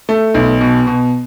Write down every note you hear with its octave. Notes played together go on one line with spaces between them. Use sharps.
A3
B1
B2
B2